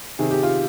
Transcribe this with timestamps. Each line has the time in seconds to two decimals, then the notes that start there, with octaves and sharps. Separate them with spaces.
0.19 C3 D#3 G#4
0.31 G4
0.43 F4